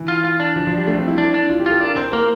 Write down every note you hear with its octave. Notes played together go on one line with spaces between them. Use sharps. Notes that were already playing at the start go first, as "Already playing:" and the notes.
Already playing: E3
F4
F4
D4
F3
F3
G3
A3
C4
E4
D4
D4
F4
G4
F4 A4
D4 A#4
C4 C5
A#3 A#4